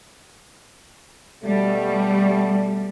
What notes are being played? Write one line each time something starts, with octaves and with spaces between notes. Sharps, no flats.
B2 G3 A3